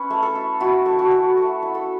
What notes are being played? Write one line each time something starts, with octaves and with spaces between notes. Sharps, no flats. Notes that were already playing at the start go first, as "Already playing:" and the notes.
Already playing: C#4 E4 B4
A3
A4
E4
E4 F#4
A3
F#4
E4
A3
E4
A4